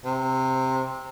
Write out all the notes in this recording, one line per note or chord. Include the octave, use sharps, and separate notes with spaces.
C3